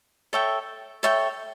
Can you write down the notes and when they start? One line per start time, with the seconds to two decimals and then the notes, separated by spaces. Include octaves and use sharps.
0.33 A4 C#5 E5 G5
1.03 A4 C#5 E5 G5